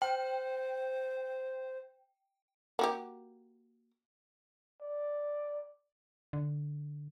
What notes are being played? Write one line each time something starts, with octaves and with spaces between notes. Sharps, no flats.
C5 G5
A#3 F#4 G4
D5
D3